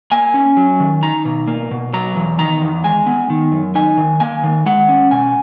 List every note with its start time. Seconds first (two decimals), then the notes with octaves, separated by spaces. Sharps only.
0.12 A#3 G#5
0.34 C#4
0.57 F#3
0.80 D#3
1.03 D#4 A#5
1.25 B2
1.48 A#3
1.71 B2
1.93 F#3 A#5
2.16 E2
2.39 D#3 A#5
2.61 E2
2.84 G#3 G#5
3.06 B3
3.30 D#3
3.52 F#2
3.75 D#4 G#5
3.97 D#3
4.20 A#3 G#5
4.44 D#3
4.66 G#3 F#5
4.89 C#4
5.11 B2 G#5